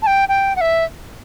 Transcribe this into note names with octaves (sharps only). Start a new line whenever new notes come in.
A5
G5
G5
F#5
E5